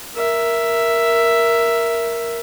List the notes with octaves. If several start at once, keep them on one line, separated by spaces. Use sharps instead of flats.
A#4 E5